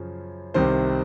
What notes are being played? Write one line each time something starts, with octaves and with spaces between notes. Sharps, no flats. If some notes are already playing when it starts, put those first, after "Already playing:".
Already playing: F#2 C#3 F3
C2 C3 D#3 C5